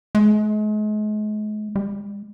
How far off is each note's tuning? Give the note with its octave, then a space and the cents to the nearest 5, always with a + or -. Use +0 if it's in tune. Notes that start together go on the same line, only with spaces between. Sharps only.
G#3 +40
G#3 -40